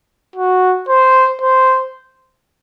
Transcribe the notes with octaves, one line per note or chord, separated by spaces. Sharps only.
F#4
C5
C5